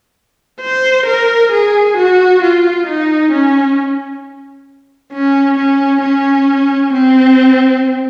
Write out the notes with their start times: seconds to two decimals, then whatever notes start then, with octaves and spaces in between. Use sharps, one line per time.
0.62 C5
1.06 A#4
1.52 G#4
1.97 F#4
2.42 F4
2.87 D#4
3.32 C#4
5.13 C#4
5.58 C#4
6.02 C#4
6.93 C4